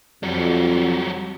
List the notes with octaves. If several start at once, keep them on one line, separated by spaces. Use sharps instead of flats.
F2 F#3 G3